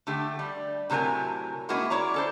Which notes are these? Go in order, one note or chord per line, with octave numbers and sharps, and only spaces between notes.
D3 A3 G4
G3
A2 C3 F#3 A#4 G#5
G#3 A#3 B3 C#4 E4 F#4
E4 C#5 D5 A#5
C#4 A4 C5